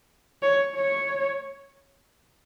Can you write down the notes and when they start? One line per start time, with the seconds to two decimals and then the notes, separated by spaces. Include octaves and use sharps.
0.42 C#5
0.75 C#5